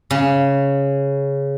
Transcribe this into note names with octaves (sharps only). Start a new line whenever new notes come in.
C#3